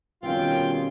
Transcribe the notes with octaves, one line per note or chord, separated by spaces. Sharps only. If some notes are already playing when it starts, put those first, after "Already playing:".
B2 D#3 G3 C4 C#4 F4 G5